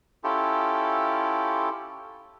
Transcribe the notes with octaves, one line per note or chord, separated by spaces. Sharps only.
C#4 E4 F4 G4 A4